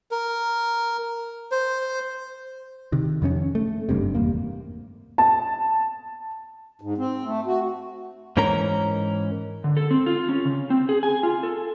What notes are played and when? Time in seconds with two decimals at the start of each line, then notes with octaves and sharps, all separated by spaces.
0.11 A#4
1.51 C5
2.92 C3 D#3
3.22 F2 D#3 B3 C#4
3.55 A3
3.89 F#1 G2 C3
4.15 G#1 E2 A#3
5.18 A5
6.81 G#2
6.98 C4
7.25 A3
7.46 F#4
8.37 G#2 E3 C#4 A#4 A#5
9.64 D3
9.77 A4
9.91 C4
10.06 F4
10.29 C#4
10.45 C#3
10.70 C4
10.89 G#4
11.03 G#5
11.23 F4
11.43 A4